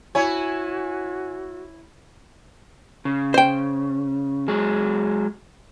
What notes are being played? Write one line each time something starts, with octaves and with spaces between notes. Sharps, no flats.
E4 F#4 C#5 G#5
C#3
C5 G5
F#3 G#3 G#4